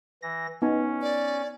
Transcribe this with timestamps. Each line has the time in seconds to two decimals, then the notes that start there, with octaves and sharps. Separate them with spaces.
0.22 E3 A#6
0.62 B3 C#4 D#4
1.02 D5